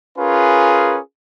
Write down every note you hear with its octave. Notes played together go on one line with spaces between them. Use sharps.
C#4 F4 G#4 A#4 B4